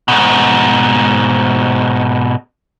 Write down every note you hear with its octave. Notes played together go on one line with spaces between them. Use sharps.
G#2 B2